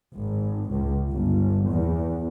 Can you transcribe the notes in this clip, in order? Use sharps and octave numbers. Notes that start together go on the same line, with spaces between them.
G#1
C#2
G1
E2